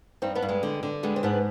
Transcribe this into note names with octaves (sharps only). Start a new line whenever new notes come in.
G2 C4 D#4
B3 D4
G2
G#3 C4
D3
D3
G3 G#3 B3
C4
G#2 B3 D4